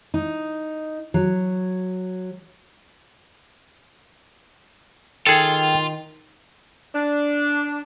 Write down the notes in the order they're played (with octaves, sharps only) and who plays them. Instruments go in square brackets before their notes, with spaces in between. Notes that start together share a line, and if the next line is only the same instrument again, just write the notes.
[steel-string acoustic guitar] D#4
F#3
[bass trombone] D#3 [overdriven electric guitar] F4 [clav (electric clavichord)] G#4 A4 [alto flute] G5
[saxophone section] D4